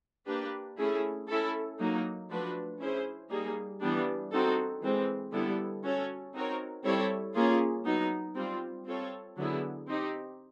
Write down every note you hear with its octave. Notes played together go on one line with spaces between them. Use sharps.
A#3 D4 G4 B4
A3 C#4 E4 G#4
C#4 E4 A4
F#3 A#3 D#4
F3 A3 D4 F#4 B4
C#4 E4 G#4 C5
G3 A#3 D#4 G#4
E3 G3 B3 D4
C4 D#4 F#4 A4
E3 G#3 C4
D3 G3 B3 E4 A4
C#4 F#4 A4 C#5
C4 D#4 F#4 A#4 C#5
G3 C4 E4 A4 C#5
A#3 C#4 F4 G#4
F#3 B3 D#4
G3 C4 F4
C4 F4 A4 C#5
D3 F#3 B3 E4 G#4
C4 D#4 G4